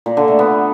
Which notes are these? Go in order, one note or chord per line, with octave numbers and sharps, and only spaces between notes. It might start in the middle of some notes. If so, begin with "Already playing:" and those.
A#2
D3
A3
B3